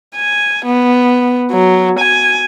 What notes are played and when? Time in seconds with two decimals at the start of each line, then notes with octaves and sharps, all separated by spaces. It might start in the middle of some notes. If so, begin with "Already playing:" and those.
0.16 G#5
0.65 B3
1.52 F#3
1.99 G#5